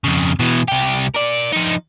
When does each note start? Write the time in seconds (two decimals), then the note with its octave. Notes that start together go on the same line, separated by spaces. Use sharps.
0.04 F2 C#3
0.39 B2 E3
0.68 C2 G4
1.14 A#4 D5
1.52 F3 D#4